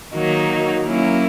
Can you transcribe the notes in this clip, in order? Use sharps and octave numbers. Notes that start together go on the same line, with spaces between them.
D#3 F#3 A#3 D#4
F#3 A#3 C#4 E4